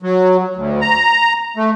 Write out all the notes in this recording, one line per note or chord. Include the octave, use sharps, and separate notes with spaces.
F#3
D2
A#5
A3